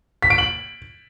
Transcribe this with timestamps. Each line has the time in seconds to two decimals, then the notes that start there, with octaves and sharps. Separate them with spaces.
0.22 B6
0.30 D7
0.38 F#7